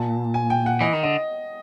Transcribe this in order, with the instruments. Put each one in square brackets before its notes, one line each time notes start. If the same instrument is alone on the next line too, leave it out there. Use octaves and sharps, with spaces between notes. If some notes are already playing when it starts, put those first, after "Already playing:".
Already playing: [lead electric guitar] A#2 [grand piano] A5
[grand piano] G#5
G5
F#5
[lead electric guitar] E3 [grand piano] D#5
[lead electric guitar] D#3
[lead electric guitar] D3 [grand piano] D#5